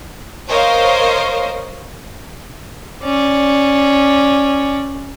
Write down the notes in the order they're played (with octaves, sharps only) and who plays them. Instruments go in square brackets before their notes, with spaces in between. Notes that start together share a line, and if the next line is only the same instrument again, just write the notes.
[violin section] A#4 C5 C#5 D#5 F5
[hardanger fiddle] C#4 D5